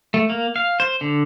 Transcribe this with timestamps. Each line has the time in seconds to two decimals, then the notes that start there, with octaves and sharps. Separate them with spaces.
0.14 A3
0.30 A#3
0.56 F5
0.80 C5
1.01 D3